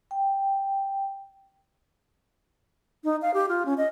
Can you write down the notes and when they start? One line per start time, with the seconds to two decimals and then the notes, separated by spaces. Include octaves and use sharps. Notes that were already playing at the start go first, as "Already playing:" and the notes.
0.11 G5
3.04 D#4
3.22 F5
3.34 G4
3.49 F4
3.66 C#4
3.78 D#5